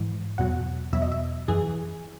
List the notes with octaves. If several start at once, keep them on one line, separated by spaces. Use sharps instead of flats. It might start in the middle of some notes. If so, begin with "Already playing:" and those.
Already playing: G#2 E3
E2 B2 F#3 F#5
E2 B2 F#3 E5
D#5
E5
F#2 E3 G#4